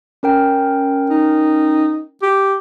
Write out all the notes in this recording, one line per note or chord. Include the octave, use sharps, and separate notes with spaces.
C#4 A#4 G5
D#4
G4